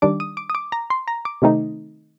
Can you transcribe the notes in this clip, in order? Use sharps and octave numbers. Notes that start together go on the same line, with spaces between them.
D#3 G3 D4 D6
D#6
D6
D#6
D6
A#5
C6
A#5
D6
C3 D#3 A3 C4 D#4